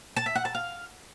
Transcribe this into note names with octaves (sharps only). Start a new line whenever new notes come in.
A5
E5
F#5
A5
F5